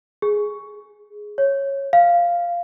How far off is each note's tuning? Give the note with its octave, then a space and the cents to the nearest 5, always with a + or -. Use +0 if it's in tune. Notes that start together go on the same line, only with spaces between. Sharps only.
G#4 +5
C#5 -10
F5 -5